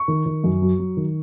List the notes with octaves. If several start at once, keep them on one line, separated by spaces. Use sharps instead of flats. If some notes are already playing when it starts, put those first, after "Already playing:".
Already playing: C#6
D#3
D#3
F#2
F#3
F#3
D#3